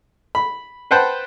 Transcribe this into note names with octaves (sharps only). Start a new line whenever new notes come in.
B5
B4 C5 F#5 G5 A5 B5